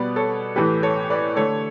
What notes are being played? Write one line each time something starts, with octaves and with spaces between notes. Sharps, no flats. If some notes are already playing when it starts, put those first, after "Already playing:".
Already playing: B2 G3 B3 B4 D5
A4 C#5
A2 E3 A3 G4 B4
A4 C#5
B4 D5
D3 A3 A4 C#5